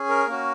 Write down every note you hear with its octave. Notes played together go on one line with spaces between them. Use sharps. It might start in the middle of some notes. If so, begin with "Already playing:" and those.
Already playing: C#4 G#4
A#4
A#3 C#4 F#4